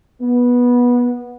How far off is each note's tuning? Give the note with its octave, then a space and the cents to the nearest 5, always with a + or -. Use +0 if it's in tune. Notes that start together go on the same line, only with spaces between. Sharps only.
B3 -15